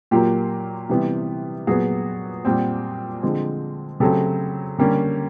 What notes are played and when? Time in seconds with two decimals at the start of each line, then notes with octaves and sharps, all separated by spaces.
0.11 A#2 F#3 A#3 F4 G4
0.89 C3 E3 G3 B3
1.67 A#2 F#3 B3 F#4 G#4
2.45 A#2 G3 C4
3.22 D3 F3 G#3 C4
4.00 C#3 F#3 A3 C4 G4 A4
4.78 D3 G3 A#3 C#4